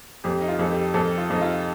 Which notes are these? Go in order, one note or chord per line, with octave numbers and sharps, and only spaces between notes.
F2 G4
D#4
F4
F2 A4
G4
F2 A4
F4
F2 D#4
F4